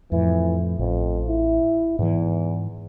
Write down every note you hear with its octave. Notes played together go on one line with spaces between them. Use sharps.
F2 A2 E3
A1 F2
E4
E2 G#2 E3